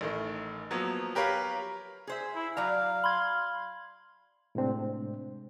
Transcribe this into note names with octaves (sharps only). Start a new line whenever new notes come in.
A1 D#3 A3
F3 F#3 A#3 B3
G4 A#4 B4 C#5 F5
G#4 C5 E5
E4
F#3 D5 F5 A#5
B5 C6 G#6
A2 C3 G#3 C4 D4